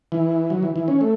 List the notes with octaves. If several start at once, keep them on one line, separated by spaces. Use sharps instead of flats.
E3
F#3
E3
E3
C#4
A3